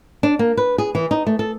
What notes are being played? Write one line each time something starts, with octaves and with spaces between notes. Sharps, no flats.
D4
A#3
B4
G#4
E3
D#4
A3
A4